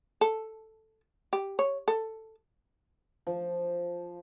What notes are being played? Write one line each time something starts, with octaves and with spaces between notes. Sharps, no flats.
A4
G4
C#5
A4
F3